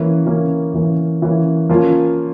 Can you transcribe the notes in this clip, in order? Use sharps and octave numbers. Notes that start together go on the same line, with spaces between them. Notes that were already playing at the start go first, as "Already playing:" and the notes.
Already playing: E3 A#3 C#4
E3 A#3 C#4
E3 A#3 C#4
E3 A#3 C#4
F3 A#3 C#4 F4